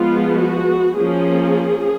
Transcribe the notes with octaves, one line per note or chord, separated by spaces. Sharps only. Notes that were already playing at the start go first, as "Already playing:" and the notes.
Already playing: F3 G#3 B3 F4
F#4
F3 A#3 C#4 G#4